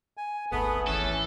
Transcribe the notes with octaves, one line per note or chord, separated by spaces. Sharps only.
G#5
D#1 G#1 A3 B3 G#4
E3 C#4 A4